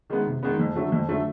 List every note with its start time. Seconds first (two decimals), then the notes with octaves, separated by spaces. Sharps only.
0.10 D#3 G#3 B3
0.26 C3
0.43 D#3 G#3 B3
0.59 F2
0.76 D3 F#3 A3
0.92 F2
1.09 D3 F#3 A3